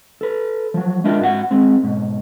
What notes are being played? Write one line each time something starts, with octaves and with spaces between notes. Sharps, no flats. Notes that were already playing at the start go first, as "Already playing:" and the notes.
A4 B4
F3 F#3
G#3 D4 E4 F4 A#4
G#2 F#4 G4 F#5
G#3 C4
G#2 B2